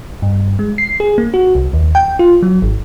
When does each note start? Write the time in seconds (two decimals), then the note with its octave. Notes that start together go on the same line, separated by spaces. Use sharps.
0.22 G2
0.59 G#3
0.78 C7
1.00 G#4
1.18 A#3
1.34 F#4
1.55 C2
1.73 D#2
1.95 G5
2.19 F4
2.43 F#3
2.62 G#1